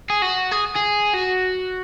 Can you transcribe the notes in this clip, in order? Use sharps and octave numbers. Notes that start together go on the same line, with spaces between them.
G#4
F#4
G#4
G#4
F#4